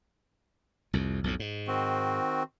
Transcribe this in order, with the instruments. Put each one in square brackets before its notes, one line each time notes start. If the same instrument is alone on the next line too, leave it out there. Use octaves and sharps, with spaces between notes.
[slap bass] C2 F2
B1 F2 A2
G#2
[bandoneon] D#3 C4 F#4